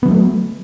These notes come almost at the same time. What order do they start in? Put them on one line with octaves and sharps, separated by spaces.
B3 E3 F#3 A3